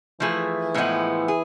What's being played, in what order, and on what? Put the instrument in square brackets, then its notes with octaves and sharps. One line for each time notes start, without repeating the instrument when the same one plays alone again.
[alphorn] E3 [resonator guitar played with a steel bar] F3 A3 E4 G#4
[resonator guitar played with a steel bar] A2 F3 G#3 B3 E4
G#4